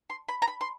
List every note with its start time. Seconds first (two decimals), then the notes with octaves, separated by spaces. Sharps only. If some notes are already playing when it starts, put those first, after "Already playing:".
0.10 C6
0.29 B5
0.42 A#5
0.48 B5
0.61 C6